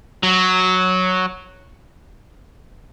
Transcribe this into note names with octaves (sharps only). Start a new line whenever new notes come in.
F#3